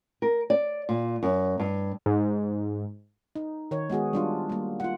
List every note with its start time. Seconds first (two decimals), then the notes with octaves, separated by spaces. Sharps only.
0.22 A#4
0.50 D5
0.89 A#2
1.23 F#2
1.59 G2
2.06 G#2
3.36 D#4
3.71 D#3 C#5
3.90 G#3 B3 F#4 G#4
4.13 G3 D4 F4
4.49 G3 A#3
4.80 F4 F#5